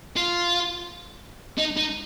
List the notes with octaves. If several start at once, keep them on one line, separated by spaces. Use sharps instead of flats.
F4
D#4
D#4